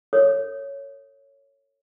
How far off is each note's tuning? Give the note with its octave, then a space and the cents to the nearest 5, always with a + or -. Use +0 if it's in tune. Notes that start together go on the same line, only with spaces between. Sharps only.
A4 +40 C#5 +0 D#6 +0